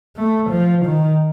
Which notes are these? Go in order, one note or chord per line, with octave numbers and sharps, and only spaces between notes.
A3
F3
D#3